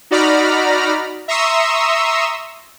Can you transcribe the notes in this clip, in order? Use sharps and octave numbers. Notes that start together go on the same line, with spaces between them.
D#4 F#4 D5 A#5 B5 F6
E5 A#5 C6 C#6 D#6 E6